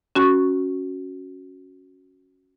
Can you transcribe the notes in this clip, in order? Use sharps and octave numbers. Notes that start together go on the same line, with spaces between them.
C#4 F#4 C#6